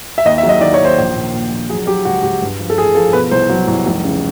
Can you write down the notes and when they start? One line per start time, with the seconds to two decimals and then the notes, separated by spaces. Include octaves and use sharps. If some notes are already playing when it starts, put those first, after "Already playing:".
0.18 E5
0.25 D#2 D#5
0.38 E5
0.43 F#3
0.49 D#5
0.61 D#3 D5
0.74 C#5
0.79 D#2
0.85 C5
0.98 A#1
1.15 A#2
1.33 A#2
1.51 A#1
1.70 F#3 G#4
1.87 F#3 G4
2.05 C#2 F#4
2.23 C#2 G4
2.42 G2
2.59 F3
2.70 A4
2.78 A1 G#4
2.95 F3 A4
3.13 B2 B4
3.31 C2 C5
3.49 F#3
3.68 C2
3.86 F1
4.04 C#3